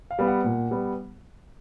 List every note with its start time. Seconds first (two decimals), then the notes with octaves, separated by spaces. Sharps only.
0.11 F5
0.19 G3 B3
0.28 F#5
0.44 A#2
0.71 G3 B3